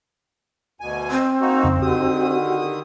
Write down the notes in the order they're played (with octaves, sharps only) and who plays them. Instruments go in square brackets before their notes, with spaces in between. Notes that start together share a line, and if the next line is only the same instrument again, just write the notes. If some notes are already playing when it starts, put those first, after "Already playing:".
[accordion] D2 B2 G#5
[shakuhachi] C4
[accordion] A#3 D#4 F#4
[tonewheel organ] F2 C#3
[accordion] D3 D#3 D#6 [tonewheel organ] F#4 G4